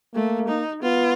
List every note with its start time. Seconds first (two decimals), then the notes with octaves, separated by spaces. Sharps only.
0.14 A3 A#3
0.48 D#4
0.82 B3 F4